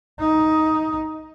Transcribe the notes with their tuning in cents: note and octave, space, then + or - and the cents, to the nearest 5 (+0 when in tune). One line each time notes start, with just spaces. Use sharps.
D#4 +10